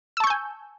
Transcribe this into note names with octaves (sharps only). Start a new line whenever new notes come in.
G#5 A5 C#6 E6 G6